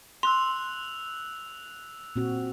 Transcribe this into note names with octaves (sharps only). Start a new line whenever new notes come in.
C6 E6 F#6 F7
A#2 C4 F#4